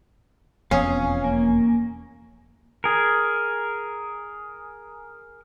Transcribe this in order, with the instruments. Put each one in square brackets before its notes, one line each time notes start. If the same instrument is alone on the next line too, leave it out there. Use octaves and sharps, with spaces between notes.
[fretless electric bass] E1 F2 B3 [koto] C#4 [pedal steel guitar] F5 D#6
[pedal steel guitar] A#3
G#4 A#4